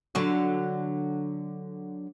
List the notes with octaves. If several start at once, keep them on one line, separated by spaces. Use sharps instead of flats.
D3 F#3 F#4